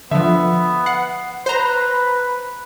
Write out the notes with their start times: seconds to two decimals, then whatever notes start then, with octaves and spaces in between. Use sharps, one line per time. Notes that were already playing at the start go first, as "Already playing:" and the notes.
0.11 D3 F3 B3 E5
0.86 F#5 C7
1.46 B4 C5 A#5